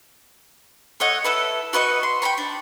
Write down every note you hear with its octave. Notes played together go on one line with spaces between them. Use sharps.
A3 C#5 D#5 F#5
E4 A4 B4
F#4 B4 D#5 C#6
C6
G5 A#5 B5 C#6
D4